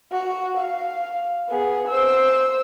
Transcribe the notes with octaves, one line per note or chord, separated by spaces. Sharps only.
F#4
F5
B3 G#4
C5 E6